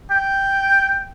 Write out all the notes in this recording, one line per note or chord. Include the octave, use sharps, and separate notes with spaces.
G5